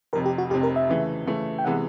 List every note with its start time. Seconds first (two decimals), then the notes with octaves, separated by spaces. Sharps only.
0.13 F1 F2 C3 A#4
0.26 G4
0.38 F#4
0.50 F1 G4
0.54 F2 C3
0.63 A#4
0.76 E5
0.89 C#3 E3 A3
1.26 C#3 E3 A3
1.59 G5
1.65 C3 E3 G#3 B3 F#5